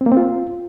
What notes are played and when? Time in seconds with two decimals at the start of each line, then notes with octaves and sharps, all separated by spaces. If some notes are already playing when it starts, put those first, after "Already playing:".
0.01 C4
0.06 A#3
0.12 C4
0.17 F4